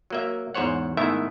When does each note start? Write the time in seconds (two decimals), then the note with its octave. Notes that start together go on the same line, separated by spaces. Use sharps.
0.10 F#3 A#3 E5
0.55 E2 G#2 C5 C#5 F#5
0.97 G#2 D#3 A3 B3 E4 E5